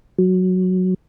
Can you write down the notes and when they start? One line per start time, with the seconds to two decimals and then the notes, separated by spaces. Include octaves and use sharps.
0.19 F#3